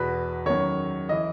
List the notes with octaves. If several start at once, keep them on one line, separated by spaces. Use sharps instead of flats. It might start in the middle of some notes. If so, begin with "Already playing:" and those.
Already playing: E2 B2 B4
F#2 D#3 C#5
E3 D#5